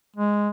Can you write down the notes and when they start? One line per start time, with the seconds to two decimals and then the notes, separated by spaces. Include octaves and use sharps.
0.16 G#3